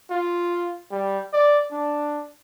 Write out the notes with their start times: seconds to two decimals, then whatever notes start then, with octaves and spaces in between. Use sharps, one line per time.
0.11 F4
0.92 G3
1.33 D5
1.72 D4